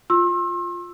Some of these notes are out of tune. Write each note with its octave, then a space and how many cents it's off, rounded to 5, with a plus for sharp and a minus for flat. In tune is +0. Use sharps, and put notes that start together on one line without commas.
F4 +5 C6 +40 E6 +0